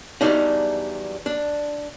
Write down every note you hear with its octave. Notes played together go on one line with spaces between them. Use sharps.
E2 G#2 F#3 G3 D4 D#4
D4